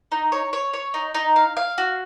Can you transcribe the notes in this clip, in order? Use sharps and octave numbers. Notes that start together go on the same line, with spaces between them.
D#4
C#5
C#5
C#5
D#4
D#4
F5
F5
F#4